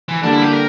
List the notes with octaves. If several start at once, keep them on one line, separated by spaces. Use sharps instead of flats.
E3
D3 G3 A#3 D4
E4
G4
A#4